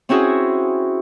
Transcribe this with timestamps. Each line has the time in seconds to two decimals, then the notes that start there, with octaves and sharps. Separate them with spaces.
0.09 C4 C#4 E4 F#4 G#4